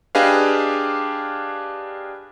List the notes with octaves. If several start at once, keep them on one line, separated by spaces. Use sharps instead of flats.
D4 G4 G#4 B4 D#5 F5